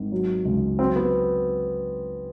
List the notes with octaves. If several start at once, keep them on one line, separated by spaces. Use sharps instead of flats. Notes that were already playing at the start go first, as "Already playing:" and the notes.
Already playing: G#1
F#3
C#2
F#3 C4
B3